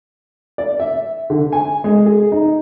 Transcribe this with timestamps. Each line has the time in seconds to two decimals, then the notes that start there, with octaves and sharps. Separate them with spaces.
0.58 D5
0.80 E5
1.30 D3
1.53 G#5
1.84 G#3
2.06 G#4
2.32 D#4